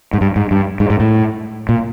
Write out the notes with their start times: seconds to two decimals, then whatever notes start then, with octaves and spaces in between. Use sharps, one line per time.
0.13 G#2
0.21 G2
0.36 G#2
0.51 G2
0.80 G#2
0.90 G#2
1.00 A2
1.69 A#2